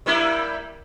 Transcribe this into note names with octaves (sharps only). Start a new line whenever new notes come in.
G3 A#3 E4